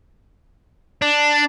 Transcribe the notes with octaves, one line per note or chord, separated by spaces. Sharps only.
D4